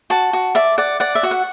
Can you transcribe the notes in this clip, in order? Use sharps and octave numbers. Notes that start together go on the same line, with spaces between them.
F#4 A5
F#4
D5 E5
D5 F#5
D5 F#5
E5
F#4
F#5